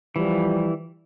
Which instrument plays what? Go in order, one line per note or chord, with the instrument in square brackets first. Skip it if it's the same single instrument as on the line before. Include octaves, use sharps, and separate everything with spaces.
[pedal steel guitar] E3 [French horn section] F3 G3